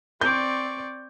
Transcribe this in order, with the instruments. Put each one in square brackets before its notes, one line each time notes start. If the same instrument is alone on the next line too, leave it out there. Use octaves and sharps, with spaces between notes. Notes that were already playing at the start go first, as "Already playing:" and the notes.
[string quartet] C4 D5 C#6 [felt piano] G6